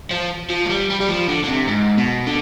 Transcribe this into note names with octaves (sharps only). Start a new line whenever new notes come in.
F3
F3
G#3
G3
G3
G3
F3
D3
D3
C3
G#2
B2
D3